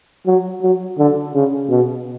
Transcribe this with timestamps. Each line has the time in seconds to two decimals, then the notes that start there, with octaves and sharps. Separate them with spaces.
0.27 F#3
0.62 F#3
0.98 D3
1.34 C#3
1.70 B2